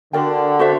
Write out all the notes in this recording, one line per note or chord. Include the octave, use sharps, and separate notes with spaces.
D3 F#4 A#4 D5 G5
F#4 A4 C5 E5